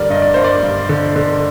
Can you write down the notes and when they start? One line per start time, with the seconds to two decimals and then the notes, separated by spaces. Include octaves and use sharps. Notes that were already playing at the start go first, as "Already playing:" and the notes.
Already playing: G2 D3 G3 A#4 D5
0.10 G2 D#5
0.22 D5
0.34 G2 C5
0.44 D5
0.63 G2
0.89 D3
1.16 D3